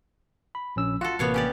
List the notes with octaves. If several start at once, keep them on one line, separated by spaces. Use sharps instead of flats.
B5
A#1 C#4 E6
F4 F#4 A4 F#5
A1 C3 A#3 B3 C#5 F5
C#4 G4 D5